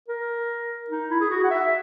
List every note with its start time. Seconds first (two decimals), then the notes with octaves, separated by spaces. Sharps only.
0.08 A#4
0.90 D#4
1.10 E4
1.21 G#4
1.30 F#4
1.44 F#5
1.50 E5